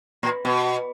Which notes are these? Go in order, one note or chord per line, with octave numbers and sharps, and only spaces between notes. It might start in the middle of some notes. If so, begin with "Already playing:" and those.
A#2
B2